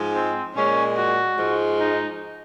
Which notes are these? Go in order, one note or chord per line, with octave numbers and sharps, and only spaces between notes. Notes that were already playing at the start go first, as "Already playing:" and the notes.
Already playing: G#2 F3 G#3
C4
A#2 G#3 C#4
F#4
G#2 F3 G#3
D#4